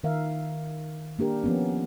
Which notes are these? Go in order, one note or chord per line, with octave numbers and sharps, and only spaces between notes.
D#3 A#4 E5 F5
A#3 D4 G4 A#4
F3 B3 C#4